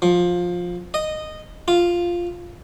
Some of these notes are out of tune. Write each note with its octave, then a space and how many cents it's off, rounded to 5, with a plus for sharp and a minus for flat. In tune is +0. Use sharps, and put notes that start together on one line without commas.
F3 +15
D#5 -10
F4 +0